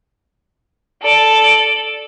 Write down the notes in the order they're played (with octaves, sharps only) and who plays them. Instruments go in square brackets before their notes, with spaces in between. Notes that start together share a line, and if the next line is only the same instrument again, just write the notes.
[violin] A4 D5